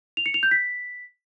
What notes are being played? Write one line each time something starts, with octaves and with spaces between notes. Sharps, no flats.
F7
C#7
F7
G6
B6